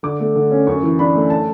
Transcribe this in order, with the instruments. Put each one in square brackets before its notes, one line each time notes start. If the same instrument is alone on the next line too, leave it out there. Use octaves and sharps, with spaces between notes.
[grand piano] D3 D6
A3
D3
C#4
F#2 C#6
E3
D4 B5
A3
A5